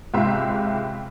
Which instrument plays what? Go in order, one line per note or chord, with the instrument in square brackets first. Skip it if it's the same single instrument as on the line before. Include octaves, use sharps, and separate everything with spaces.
[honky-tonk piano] C#2 G#2 C3 E5 F5 C6